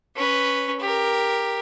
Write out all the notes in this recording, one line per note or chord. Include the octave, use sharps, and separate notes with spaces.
C#4 B4
G4 A#4